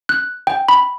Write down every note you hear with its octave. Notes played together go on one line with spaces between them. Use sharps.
F#6
G5
B5